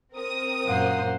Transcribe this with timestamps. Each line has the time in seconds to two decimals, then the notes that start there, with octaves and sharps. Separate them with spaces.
0.14 C4 A#4 D#6
0.66 F#2 A#2 A#3 C5 F#5